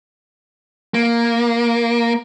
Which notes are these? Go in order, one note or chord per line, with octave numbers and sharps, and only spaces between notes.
A#3